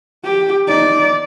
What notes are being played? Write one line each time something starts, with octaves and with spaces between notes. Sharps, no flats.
G4
D#4 D5